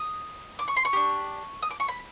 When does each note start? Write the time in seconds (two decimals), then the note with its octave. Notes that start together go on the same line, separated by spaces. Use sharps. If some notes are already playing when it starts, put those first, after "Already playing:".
Already playing: D#6
0.59 D6
0.68 C#6
0.76 C6
0.85 C#6
0.93 D4 G4
1.63 D#6
1.71 D6
1.80 C#6
1.88 B5